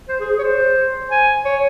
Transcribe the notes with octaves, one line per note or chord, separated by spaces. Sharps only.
C5
G#4
G#4
C#5
C5
G#5
C#5